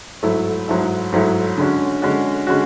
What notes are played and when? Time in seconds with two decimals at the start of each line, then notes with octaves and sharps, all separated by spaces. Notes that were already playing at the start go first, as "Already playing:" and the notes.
0.23 G#2 F#3 A3 E4 A4
0.68 G#2 F#3 A3 E4 A4
1.12 G#2 F#3 A3 E4 A4
1.57 D3 G#3 C#4 F#4
2.02 D3 G#3 C#4 F#4
2.47 D3 G#3 C#4 F#4